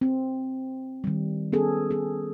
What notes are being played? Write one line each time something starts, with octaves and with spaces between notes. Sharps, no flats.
C4
D#3 G3
B3 C#4 G#4 A4
B3 G#4